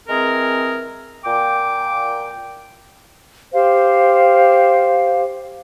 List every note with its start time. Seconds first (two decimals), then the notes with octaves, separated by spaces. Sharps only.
0.08 E3 G#3 C4 G#4 A#4
1.25 A#2 G5 D6
3.53 G4 C5 F5